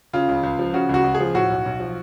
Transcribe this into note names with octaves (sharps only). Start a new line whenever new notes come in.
C#3 F4
C#2
C#2
F3
C#3 F#4
C#2 F#4
C#2
G#4
F3
A2 F#4
B1
B1
F3